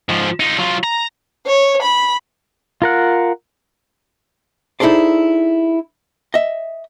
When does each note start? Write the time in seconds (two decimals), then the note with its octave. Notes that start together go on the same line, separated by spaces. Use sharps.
0.09 G#2 F3
0.40 D#4 F4
0.58 F#3 F4
0.84 A#5
1.47 C#5
1.82 B5
2.82 F4 A#4 F#5
4.80 D#4 E4 G#4 A4 C5 D5
6.34 D#5 E5